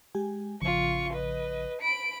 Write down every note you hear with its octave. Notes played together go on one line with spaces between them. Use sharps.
G#3 G4 G#5
A1 C#3 F3 F4 C#6
B4 D#5
B5 D7